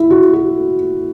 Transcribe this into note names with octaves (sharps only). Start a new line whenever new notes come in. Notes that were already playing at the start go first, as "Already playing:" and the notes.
Already playing: E4
F#4
F#4